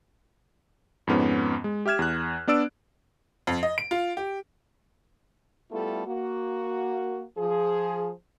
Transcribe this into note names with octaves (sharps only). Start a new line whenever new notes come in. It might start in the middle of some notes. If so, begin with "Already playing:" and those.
F2 G#2 B3 C#4
G#3
G4 E5 F6 G#6 E7
E2 F#6
B3 D4 D5 E6 D7
F2
D#5
D7
F4
G4
G3 A3 B3 E4 F4 A4
A#3 F#4
F3 G#4